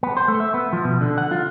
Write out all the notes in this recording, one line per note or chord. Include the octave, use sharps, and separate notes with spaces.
B3
C5
A3
E5
B3
F3
B2
D3
F#5
F4